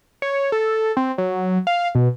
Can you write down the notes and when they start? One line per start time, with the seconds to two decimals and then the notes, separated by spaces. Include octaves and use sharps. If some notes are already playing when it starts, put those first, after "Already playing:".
0.22 C#5
0.52 A4
0.97 C4
1.18 F#3
1.67 F5
1.95 B2